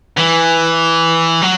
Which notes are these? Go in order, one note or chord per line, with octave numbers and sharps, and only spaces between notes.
E3
F#3